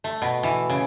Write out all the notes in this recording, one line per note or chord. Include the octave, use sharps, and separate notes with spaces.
A3
B2
E3
C#3